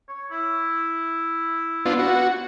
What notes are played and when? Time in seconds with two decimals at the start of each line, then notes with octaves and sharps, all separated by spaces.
0.09 C#5
0.31 E4
1.86 B3 D4 F4
1.99 F#4